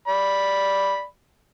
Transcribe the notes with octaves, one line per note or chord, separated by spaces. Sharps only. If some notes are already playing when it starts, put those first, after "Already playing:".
D5 B5